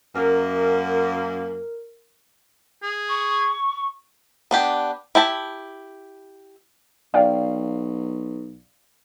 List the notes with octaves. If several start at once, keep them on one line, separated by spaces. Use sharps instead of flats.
F#2 A#3 A#4 F6
G#4
C#6
B3 D4 G4
E4 G4 A5
B1 D5 F5 G5